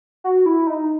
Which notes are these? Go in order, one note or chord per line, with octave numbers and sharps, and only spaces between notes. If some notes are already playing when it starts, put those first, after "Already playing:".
F#4
E4
D#4